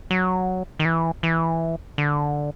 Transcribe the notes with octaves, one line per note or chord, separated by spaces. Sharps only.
F#3
D#3
E3
E3
D3